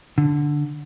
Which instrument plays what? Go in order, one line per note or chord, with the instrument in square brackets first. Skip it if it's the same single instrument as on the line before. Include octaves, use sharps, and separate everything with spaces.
[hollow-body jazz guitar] D3